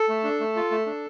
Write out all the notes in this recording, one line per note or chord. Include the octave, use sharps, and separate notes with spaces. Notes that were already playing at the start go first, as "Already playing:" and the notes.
Already playing: A4
A3
D4
A3
F4
A3
D4